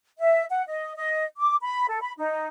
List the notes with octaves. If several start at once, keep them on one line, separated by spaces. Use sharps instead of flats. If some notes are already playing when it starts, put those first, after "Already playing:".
E5
F#5
D#5
D#5
D6
B5
A4
B5
D#4